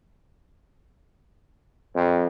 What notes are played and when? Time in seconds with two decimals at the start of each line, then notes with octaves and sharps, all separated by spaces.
1.95 F2